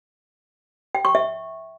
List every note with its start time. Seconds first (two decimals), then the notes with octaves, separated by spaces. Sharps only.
0.95 G5
1.05 C#6
1.15 E5